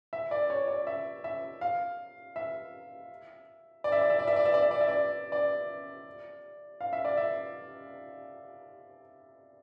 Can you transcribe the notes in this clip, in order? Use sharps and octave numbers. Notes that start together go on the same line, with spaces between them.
E5
D5
C#5
D5
E5
E5
F5
E5
D5
E5
D5
E5
D5
E5
D5
E5
D5
E5
D5
E5
D5
D5
F5
E5
D5
E5